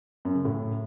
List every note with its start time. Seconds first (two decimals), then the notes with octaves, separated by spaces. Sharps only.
0.25 F#2
0.35 C#3
0.45 A2